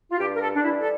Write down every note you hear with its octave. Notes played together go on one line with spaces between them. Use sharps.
F4
G2 G4
A#4
A4
D4
E3 G3 E4
A4